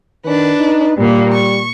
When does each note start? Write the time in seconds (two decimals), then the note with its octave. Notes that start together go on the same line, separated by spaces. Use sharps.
0.25 D#3 D4 B4
0.58 D#4
0.98 A#2 G3 A#3
1.33 C#6